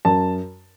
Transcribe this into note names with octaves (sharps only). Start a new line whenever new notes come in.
F#2 A5